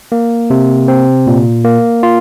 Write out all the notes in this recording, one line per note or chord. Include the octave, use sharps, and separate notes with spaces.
A#3
C3
C4
A#2
A#3
F4